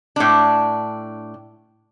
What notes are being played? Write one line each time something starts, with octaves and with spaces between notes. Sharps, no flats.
A2 D4